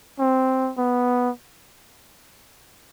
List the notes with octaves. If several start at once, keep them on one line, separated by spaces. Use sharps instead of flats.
C4
B3